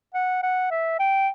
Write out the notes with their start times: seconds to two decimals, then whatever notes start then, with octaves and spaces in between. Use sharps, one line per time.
0.14 F#5
0.43 F#5
0.71 E5
0.99 G5